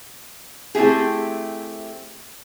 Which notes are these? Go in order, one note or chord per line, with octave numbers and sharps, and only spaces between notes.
A3 C4 E4 G4 G#4